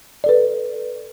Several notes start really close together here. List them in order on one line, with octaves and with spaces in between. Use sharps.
D5 A4 B4